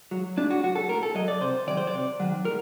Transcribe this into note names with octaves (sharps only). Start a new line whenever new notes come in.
F#3
A2 D4
F#4
F#3 F#4
A4
A2 A#4
A4
F#3 D#5
D5
C3 C5
D#3 F#3 D5
C5
D5
C3
D#3 F#3
A2 A#4